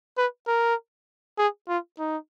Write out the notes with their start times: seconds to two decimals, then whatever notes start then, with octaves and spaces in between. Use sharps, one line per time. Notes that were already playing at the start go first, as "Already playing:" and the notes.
0.17 B4
0.47 A#4
1.38 G#4
1.69 F4
1.99 D#4